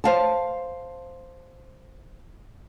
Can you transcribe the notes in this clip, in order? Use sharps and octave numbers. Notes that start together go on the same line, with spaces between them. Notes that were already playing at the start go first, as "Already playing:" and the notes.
C5 F5 A5